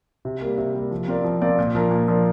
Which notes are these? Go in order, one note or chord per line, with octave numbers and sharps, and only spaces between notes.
C3
G3 A#3
C3
G3 A#3
F3
C4 F4 A#4 D5
F3
C4 F4 A#4 D5
A#2
F3 D4 A#4
A#2
F3 D4 A#4